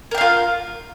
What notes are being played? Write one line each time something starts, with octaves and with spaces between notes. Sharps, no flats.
F4 A#4 F5 G5